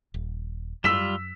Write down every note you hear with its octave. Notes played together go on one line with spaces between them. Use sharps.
D#1
F#2 G3 F4 E6 B6 E7